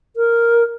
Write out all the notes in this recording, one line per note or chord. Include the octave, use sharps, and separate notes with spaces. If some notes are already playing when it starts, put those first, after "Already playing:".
A#4